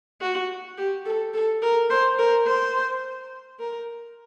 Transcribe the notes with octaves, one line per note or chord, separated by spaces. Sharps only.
F#4
G4
A4
A4
A#4
C5
A#4
C5
A#4